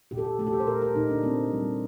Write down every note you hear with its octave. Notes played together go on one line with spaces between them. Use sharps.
A#2 G4
A4
G4
A3 A4
G4
A4
C5
A#2 A#4
A#4
A#2 D#4
D4
A#3 C4
G3